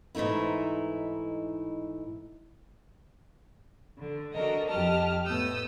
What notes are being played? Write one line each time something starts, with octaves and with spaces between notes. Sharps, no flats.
G#2 E3 A3 D#4 E4
D3
D4 F#4 A4 A#4 D#5
F2 F3 G4 D#5 A5 F6
A2 B3 D#6 E6 G6